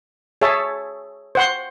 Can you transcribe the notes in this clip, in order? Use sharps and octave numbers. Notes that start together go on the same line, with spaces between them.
G#4 C#5 E5 A5
C5 F#5 C6